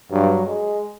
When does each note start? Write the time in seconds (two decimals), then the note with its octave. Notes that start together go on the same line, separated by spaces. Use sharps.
0.11 G2 F#3
0.47 G#3